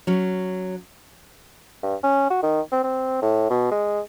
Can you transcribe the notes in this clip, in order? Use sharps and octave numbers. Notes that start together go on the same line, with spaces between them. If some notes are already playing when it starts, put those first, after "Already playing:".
F#3 C#4
G2
C#4
F#4
D#3
C4
C4
A2
B2
G#3